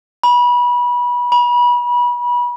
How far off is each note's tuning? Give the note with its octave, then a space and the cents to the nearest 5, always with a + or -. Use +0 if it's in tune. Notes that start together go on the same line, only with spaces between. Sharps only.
B5 -25
B5 -30